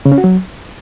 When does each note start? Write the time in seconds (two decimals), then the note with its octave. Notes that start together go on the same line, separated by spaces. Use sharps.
0.05 C#3
0.12 C#4
0.18 F#4
0.24 F#3